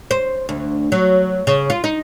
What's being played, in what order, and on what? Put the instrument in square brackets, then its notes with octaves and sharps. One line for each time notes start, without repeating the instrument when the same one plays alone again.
[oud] C5
D2
F#3
C#3
F4
D#4